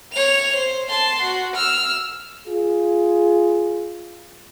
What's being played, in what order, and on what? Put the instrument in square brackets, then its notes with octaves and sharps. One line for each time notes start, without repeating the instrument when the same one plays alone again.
[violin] C#5 F7
C5
A5 C6
F#4
E6 F6
[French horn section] F4 G#4